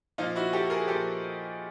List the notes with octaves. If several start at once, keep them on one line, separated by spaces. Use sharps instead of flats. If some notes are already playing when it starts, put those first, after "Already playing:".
A#2 F3 D#4 F4
E4 F#4
G4 A4
G#4 A#4
A#2 F3 G4 A4